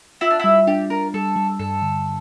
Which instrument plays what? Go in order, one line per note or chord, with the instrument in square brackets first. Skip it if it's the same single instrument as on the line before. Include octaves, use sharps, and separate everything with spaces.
[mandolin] E4 [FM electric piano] F4
[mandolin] D4
[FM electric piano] G3 [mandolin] E4
[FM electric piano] D4 [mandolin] G4
[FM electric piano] D4 [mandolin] A#4
[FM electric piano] G3 [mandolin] A4
[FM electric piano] G3
[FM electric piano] G2 [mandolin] A4
[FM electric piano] D3